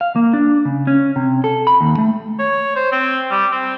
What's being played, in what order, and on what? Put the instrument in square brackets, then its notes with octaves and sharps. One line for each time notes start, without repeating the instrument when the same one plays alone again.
[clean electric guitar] F5
A#3
D4
C#3
C#4
C3
A4
B5
D#2
A3
[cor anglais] C#5
C5
C4
G3
C4